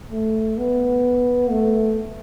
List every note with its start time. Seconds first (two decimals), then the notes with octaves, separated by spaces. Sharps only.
0.12 A3
0.58 B3
1.50 A3